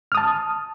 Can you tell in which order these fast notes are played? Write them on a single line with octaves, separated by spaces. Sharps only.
F6 D#6 A5